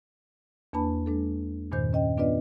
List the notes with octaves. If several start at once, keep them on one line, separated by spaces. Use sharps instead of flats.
E2 A#3 D4 B4 A5 B5
G#3 D4 A4
E2 G2 A#2 D#3 C5 G6
C#4 D#5 G5
B3 D4 F4 B4 D5 D#5